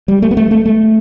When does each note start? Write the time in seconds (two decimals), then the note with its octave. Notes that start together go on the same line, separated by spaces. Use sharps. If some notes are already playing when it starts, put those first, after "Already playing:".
0.08 G3
0.22 A3
0.31 B3
0.37 A3
0.51 A3
0.66 A3